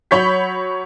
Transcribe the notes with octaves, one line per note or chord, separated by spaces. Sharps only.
F#3 C#5 B5 C#6 G6 B6